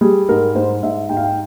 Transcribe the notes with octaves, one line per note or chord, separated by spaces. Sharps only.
G3 G#4
G#2 A#4
G#2 C5
G#2 E5
G#2 G5
F5
G5